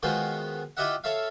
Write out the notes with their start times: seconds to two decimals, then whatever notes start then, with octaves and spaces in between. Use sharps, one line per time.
0.03 D#3 G#3 B3 F4 F#4 C5
0.77 E4 F4 G4 D#5 E5 F#5
1.04 A4 C#5 E5 F5